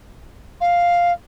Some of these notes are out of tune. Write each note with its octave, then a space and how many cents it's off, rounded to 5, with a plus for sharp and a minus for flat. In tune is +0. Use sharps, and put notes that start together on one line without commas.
F5 +0